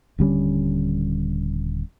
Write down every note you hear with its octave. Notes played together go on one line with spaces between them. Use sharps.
D#1 D3 G3 C#4